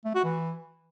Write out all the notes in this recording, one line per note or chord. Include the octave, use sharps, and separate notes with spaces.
A3
F#4
E3